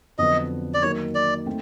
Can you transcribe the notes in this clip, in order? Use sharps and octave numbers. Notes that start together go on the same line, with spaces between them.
F2 D3 F#3 B3 D#5
D5
D#3 F#3 A#3 D#4 C#5
D5
A3 C4 D#4